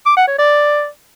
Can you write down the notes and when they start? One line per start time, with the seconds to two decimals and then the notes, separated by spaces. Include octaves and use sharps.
0.06 D6
0.17 F#5
0.28 C#5
0.39 D5